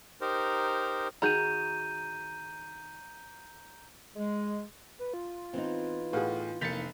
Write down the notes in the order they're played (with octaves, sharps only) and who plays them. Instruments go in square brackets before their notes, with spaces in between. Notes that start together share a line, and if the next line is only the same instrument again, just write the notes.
[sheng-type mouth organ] D#4 G4 A#4 C5
[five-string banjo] D#3 F#4 G#4 [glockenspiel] A#5 G6 D#7
[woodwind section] G#3
[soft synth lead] B4
F4
[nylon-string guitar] E3 B3 D#4 [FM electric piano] C4
[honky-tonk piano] A2 G#4 [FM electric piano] B4 F5 F#5
[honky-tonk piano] F1 B6 F7 [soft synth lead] A#3 [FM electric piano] G6 A6 C#7